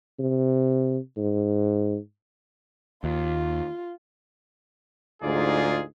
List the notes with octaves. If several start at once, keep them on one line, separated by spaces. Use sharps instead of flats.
C3
G#2
D#2 F4
D2 G#2 D#4 F4 G#4 D5